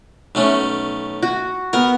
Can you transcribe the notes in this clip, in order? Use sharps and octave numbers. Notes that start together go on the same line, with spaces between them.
B1 A3 C#4
F#4
B3 A#4